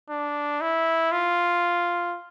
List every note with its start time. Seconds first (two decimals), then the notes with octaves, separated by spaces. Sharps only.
0.10 D4
0.61 E4
1.12 F4